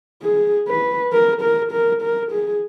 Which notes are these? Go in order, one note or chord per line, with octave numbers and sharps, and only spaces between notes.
G#4
B4
A#4
A#4
A#4
A#4
G#4